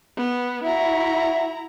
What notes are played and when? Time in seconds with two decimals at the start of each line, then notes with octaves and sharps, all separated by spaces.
0.17 B3
0.64 E4 F#4 E5 F#5 A#5